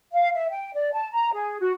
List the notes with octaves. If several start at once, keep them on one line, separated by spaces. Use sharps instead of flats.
F5
E5
G5
D5
A5
A#5
G#4
F#4